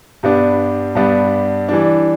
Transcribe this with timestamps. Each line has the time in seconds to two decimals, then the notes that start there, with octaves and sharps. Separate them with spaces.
0.23 G2 G3 B3 D4
0.95 G2 G3 B3 D4
1.69 E3 G3 D4